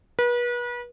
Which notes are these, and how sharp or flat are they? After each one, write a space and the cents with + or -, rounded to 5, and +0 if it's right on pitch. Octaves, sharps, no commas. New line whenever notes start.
B4 -35